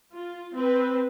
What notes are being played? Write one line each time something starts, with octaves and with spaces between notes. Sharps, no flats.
F4
C4 B4